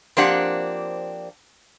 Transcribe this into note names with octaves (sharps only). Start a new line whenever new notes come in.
F3 A#3 C4 D4 G4 F#5